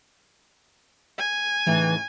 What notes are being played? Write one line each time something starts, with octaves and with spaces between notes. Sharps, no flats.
G#5
A2 C#3 E3 D#4